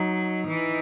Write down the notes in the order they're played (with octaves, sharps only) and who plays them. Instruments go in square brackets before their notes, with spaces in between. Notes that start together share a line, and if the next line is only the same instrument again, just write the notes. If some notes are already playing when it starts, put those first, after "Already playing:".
Already playing: [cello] F#3 [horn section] D#4
[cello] E3